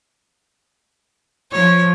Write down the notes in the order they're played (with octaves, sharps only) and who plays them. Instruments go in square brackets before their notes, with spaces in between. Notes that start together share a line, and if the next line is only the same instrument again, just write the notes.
[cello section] F3 [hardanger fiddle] C#5